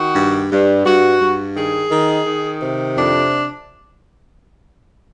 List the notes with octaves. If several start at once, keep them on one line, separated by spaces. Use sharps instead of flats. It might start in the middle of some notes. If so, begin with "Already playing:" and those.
Already playing: D#3 F#4
G2
G2
G2 F#4
G2
D#3 G#4
D#3
D#3
C3
F2 D4